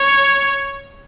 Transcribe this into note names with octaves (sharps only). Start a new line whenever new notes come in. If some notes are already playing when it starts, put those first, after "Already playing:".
Already playing: C#5